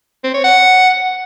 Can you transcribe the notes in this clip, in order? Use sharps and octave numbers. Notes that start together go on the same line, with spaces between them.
C4
C#5
F#5